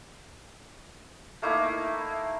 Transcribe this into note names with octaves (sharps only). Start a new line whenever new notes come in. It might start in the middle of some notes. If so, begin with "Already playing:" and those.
A3 A#3 D#4 E4